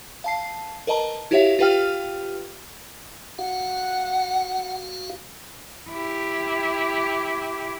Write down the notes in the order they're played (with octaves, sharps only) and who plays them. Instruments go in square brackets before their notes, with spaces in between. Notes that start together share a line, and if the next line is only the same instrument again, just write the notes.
[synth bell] F5 A5 C7
A#4 B4 D#5 A5 A#5
E4 F#4 G4 C#5 E5 F5
F4 G4 B4 F5 G5 F6
[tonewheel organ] F#4 F5 [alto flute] F#5
[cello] E4 G4